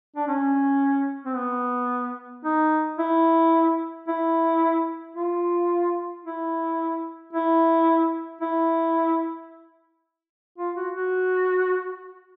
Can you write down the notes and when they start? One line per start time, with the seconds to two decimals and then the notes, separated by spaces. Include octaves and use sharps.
0.17 D4
0.28 C#4
1.25 C4
1.36 B3
2.45 D#4
2.99 E4
4.08 E4
5.16 F4
6.25 E4
7.33 E4
8.41 E4
10.59 F4
10.76 F#4
10.94 F#4